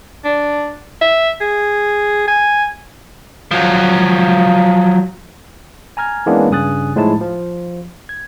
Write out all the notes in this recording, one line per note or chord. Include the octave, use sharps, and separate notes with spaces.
D4
E5
G#4
G#5
F3 F#3
G#5 A#5 F6 G#6
E3 G#3 A#3 B3 C#4 D4
G2 C#3 G#5 D#6 F#6 A6
A2 F3 G#3 D#4 E4 A5
F3
G#6